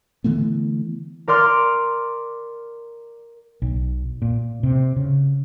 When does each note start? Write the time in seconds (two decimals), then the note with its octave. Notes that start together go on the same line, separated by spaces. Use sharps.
0.24 D3 E3 A3 B3
1.28 A#4 D5 C6 F6
3.62 B1
4.22 A#2
4.63 C3
4.96 C#3